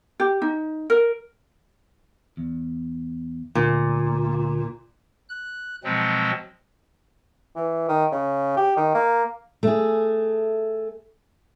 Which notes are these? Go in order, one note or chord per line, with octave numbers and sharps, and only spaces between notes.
G4
D#4
A#4
E2
D2 A#2
F#6
B2 F3 F#3 G#3 C4
E3
D#3
C#3
G4
D#3
A#3
A3 G#4